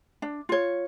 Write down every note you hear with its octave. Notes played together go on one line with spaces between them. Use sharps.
D4
F4 C#5